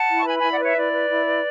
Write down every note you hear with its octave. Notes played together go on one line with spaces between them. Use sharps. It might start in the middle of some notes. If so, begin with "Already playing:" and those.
Already playing: F#5 A5
E4
C#6
B4 G#5 B5
E4 G#5 B5
D5 F#5
B4 C#5 E5
E4 D5
B4
E4
B4